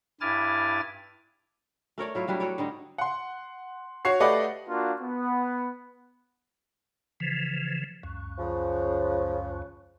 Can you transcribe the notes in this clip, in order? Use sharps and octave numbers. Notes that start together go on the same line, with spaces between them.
G2 E4 G#5 D6 F6 A6
A3 A#4 C#5 D5
F#3 E4 F4
F#3 G3 D4 E4
F#4 A4 C#5 D5
D3 G3 D#4
F#5 C6
F#4 C#5 C7
A3 G4 B4 D5 D#5 F#5
A#3 D4 F4 F#4
B3
C#3 E3 F3
C#2 F#2
C#3 F3